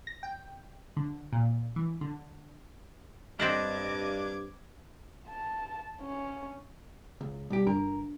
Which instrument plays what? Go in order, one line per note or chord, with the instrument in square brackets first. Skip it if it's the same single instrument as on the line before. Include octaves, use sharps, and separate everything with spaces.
[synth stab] A#6
G5
D3
A#2
E3
D3
[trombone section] G2 [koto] C4 A4 F#5 [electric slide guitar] D4 D#5 [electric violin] D6 G#6
[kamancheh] A5
C#4
[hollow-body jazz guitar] C#2
[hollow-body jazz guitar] B1 G4 [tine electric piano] G3
[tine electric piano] G1 [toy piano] D4 [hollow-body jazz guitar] A#4